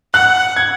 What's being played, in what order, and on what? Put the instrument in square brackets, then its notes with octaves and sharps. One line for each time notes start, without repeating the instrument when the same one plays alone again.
[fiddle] F#5 [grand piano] F#6
[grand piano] G#6